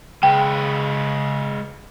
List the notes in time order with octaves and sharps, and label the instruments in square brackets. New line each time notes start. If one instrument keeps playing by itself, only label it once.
[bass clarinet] C#3 [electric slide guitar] G#3 B4 [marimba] G5